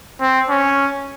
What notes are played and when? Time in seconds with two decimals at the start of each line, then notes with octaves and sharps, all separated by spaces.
0.21 C4
0.49 C#4